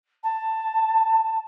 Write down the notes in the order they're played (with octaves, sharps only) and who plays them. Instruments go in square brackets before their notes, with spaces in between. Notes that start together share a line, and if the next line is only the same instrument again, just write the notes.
[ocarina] A5